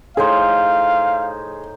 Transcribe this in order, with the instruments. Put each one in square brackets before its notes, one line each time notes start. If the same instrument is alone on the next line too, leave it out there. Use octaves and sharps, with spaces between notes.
[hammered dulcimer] A2 D#4 C5 [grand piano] G#4 [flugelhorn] F5